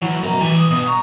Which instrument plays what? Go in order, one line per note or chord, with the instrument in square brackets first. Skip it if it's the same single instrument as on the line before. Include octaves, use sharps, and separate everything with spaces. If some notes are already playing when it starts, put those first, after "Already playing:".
[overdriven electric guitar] D2 [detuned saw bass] E3 [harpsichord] F#3
[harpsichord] F#2 [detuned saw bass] B2 [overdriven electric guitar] A3 A#5
[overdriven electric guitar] B2 G3 [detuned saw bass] E3 [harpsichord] G#5
[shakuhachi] D#6
[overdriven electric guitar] G2 [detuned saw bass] B2
[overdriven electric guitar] A#5 [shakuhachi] C#6